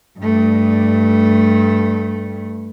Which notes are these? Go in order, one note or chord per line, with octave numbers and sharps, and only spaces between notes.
G2 A3